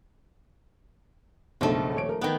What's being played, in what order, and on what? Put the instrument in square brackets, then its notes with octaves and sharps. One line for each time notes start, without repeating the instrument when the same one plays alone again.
[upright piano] F#1 B1 G2 [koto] F3 A3
[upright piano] D#1 C#5 D7
A#4
[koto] D#3 B3 [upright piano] B4 G5